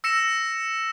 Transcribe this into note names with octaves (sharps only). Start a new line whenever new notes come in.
E6 A#6 C#7 E7